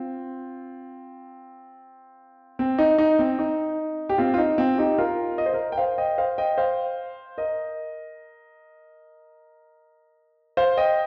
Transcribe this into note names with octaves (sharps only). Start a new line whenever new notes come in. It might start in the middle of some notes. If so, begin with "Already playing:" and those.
Already playing: C4 F4
C4
D#4
D#4
C4
D#4
G4
C4 F4
F4
D#4
C4 F4
D#4 G4
F4 A#4
D#5
C5
A#4 D#5
G5
C5 F5
D#5 G5
C5 F5
D#5 G5
C5 F5
A#4 D#5
C5 F5
D#5 G5